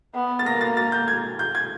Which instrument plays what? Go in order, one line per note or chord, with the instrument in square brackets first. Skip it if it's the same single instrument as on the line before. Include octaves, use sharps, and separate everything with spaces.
[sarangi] B3
[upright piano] A6
[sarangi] A#3 [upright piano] A#6
[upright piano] A6
A6
G6
G#6
G6
G#6